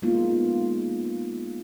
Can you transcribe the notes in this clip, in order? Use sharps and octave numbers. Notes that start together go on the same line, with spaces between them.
G#3 A#3 B3 D#4 F4